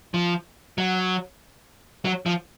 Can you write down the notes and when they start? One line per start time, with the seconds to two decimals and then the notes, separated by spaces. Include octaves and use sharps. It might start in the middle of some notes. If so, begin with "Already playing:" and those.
0.14 F3
0.78 F#3
2.05 F#3
2.26 F3